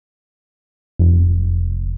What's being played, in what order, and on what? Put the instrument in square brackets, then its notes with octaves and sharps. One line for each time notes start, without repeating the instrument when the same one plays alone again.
[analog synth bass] F1